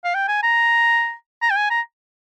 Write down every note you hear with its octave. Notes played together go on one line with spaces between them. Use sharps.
F5
G5
G#5
A#5
A#5
G5
G#5
A#5